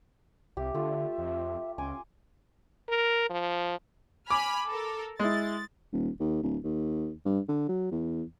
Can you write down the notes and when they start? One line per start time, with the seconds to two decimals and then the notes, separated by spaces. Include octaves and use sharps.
0.57 C2 G4 E5
0.74 D3 A3 F4
1.18 F2
1.78 C#2 C#4 G#5 C6 D6
2.89 A#4
3.30 F3
4.30 G#5 B5 D6 F6
4.68 A4 A#4
5.19 G#3 E4 A6
5.93 D#1
6.20 D#2
6.43 D1
6.64 D#2
7.25 G2
7.49 D3
7.69 F#3
7.91 E2